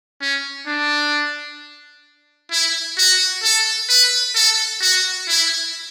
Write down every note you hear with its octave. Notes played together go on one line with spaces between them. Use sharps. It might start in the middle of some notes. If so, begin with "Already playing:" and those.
C#4
D4
E4
F#4
A4
B4
A4
F#4
E4